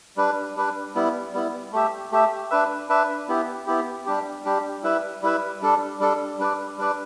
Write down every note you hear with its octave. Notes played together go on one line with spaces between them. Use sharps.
G3 D4 B4
G3 D4 B4
G3 B3 E4
G3 B3 E4
A3 G4 E5
A3 G4 E5
D4 B4 E5
D4 B4 E5
B3 E4 G4
B3 E4 G4
G3 D4 G4
G3 D4 G4
G3 E4 B4 E5
G3 E4 B4 E5
G3 D4 A4
G3 D4 A4
G3 D4 B4 D5
G3 D4 B4 D5